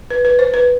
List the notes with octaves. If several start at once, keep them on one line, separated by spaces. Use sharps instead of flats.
B4
B4
C5
B4